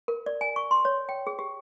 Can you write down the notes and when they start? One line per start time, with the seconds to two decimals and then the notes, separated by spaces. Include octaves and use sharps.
0.08 A#4
0.26 D5
0.41 G#5
0.56 C#6
0.71 C6
0.85 C#5
1.09 G5
1.27 G#4
1.39 G4